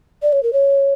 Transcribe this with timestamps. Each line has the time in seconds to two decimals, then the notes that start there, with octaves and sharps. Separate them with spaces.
0.22 D5
0.33 C#5
0.43 A#4
0.53 C#5